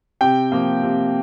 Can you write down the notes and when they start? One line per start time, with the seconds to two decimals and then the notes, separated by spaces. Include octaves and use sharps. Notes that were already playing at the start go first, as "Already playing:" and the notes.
0.21 C3 G5
0.52 F3 A#3
0.83 C3